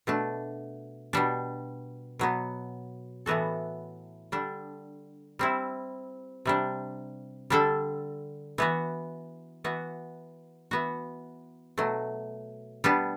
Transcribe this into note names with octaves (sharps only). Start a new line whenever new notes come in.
B2 A3 D4
B2 G3 D4
B2 F#3 B3
A2 E3 B3 F#4 A4
D3 G3 D4
G3 C4 E4
C3 G3 D4
D3 G3 D4 A4
E3 B3 F#4
E3 B3 F#4
E3 B3 F#4
B2 F#3 A3
G3 B3 D4